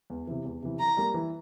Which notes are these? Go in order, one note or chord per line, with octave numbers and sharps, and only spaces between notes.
E2
C3 E3
E2
C3 E3
E3 A#5
G3 A#3
E3